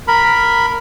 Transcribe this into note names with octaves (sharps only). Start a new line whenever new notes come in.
A#4 B5